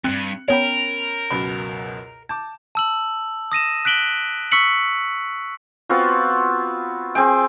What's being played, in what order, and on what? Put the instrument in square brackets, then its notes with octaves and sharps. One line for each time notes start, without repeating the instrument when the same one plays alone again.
[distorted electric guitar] E2 G2 [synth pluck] C4 [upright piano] F#6 C#7
[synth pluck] B3 C#5 [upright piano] C#4 G5 B5 [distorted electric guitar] A#4
[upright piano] C#2 F#2 B2 [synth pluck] B5
[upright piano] A5 D6 [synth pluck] G6
[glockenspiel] A5 E6 F#7
D#6 A#6 D#7 E7
F#6 B6 D7 F#7 G7
C#6 E6 B6 C#7 F#7
[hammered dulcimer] B3 C4 F4 F#4
C4 G#4 G5